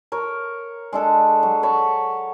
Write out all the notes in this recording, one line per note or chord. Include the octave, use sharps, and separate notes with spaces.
A#4 C#5
G#3 D4 A4
F#3
C#5 A5 B5